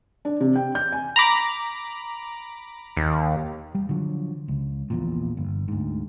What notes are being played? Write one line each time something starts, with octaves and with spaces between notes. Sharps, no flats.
D4
C3
G5
G6
G#5
A#5 B5 D6
D#2
G3
D3 F3 F#3
C#2
A#1 E2 A#2
G1
D2 G#2